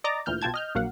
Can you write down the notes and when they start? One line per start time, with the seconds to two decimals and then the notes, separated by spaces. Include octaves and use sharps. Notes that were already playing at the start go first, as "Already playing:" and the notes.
0.04 D5 D#5 A#5 D6 A6
0.26 D2 A#2 E3 F6 G6
0.42 B1 F4 G5 A5 G#6
0.54 D#5 F6 G6
0.75 A#1 F#3 A#3 F5 F#5